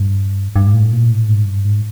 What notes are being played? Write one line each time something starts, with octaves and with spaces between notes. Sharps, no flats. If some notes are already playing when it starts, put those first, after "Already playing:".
Already playing: G2
G2
G#2
A2
A#2
A2
G#2
G2
G#2